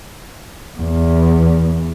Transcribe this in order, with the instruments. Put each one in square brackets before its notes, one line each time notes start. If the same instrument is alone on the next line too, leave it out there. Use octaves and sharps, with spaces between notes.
[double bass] E2